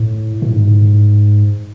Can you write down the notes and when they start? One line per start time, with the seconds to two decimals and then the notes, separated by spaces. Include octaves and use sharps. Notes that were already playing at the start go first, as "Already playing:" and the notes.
Already playing: A2
0.42 A2
0.52 G#2